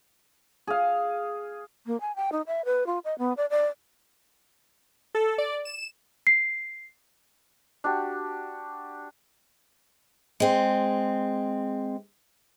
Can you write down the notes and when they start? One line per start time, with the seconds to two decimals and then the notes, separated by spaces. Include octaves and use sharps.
0.67 G#4 F5
1.86 A#3
2.01 G#5
2.16 G5
2.32 D#4
2.47 E5
2.65 B4
2.87 F4
3.05 D#5
3.18 B3
3.37 D5
3.50 D5
5.15 A4
5.38 D5
5.65 E7
6.27 C7
7.84 D4 F#4 G4
10.40 G#3 C4